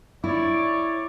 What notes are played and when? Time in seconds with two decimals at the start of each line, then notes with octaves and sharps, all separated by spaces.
0.24 E4 C#5 D5